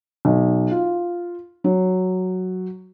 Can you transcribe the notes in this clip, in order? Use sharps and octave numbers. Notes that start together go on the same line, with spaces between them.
B1
F4
F#3